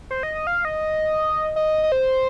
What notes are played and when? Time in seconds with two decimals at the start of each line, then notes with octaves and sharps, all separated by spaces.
0.11 C5
0.23 D#5
0.35 D#5
0.47 F5
0.65 D#5
1.56 D#5
1.84 D#5
1.92 C5